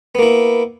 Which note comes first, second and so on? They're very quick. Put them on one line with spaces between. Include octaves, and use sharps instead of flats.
B3 A#3 E4